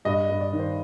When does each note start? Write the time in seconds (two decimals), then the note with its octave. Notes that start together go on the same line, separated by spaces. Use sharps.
0.05 G2 D#5
0.24 D5
0.30 G2
0.41 D5
0.53 D#3
0.59 C5